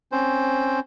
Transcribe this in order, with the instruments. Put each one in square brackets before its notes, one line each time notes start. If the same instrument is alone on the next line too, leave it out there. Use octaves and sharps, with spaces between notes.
[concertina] C4 C#4 C5